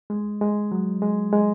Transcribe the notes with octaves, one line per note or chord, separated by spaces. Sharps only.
G#3
G#3
F#3
G#3
G#3